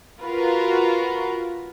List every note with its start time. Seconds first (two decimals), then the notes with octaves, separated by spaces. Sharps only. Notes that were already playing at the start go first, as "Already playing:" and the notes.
0.22 F4 F#4 A#4 B4